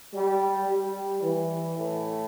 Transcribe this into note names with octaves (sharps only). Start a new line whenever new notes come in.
G3
G3
E3
A2